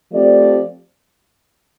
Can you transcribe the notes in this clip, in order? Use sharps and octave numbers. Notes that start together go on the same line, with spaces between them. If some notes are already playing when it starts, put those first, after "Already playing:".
F3 A3 C4 G4 D5